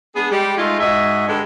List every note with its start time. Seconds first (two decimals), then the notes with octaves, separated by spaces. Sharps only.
0.16 B3 D4 G#4
0.31 G3 G#3
0.58 G#3 A3 D#4 F4
0.80 G#2 F#4 D#5 E5
1.27 G2 D3 G#3